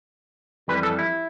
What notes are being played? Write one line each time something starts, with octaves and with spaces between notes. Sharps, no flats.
F2 E3 G3 B4
A4
E4